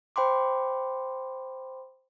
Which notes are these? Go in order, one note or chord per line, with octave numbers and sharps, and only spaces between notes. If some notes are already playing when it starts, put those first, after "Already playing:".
C5 G5 B5 C6 D6